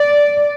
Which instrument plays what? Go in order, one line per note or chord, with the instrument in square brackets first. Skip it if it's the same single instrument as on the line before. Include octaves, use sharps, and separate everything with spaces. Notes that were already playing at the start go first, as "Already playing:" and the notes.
Already playing: [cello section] D5